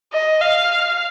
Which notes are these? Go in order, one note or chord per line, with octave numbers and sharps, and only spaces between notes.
D#5
F5